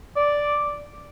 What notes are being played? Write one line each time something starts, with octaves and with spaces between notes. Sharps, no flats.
D5